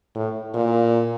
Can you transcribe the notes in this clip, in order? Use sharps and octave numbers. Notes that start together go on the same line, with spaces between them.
A2
A#2